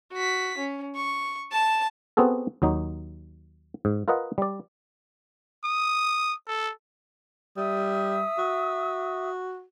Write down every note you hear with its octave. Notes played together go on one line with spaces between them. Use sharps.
F#4 B6
C#4
C#6
A5 E7
B3 C4 F#4 G#4 A4
D#2 F#3 D#4
G#2
F4 A#4 B4 D#5 F#5
G3 D5
D#6
A4
G3 E5 D#6 E6
F#4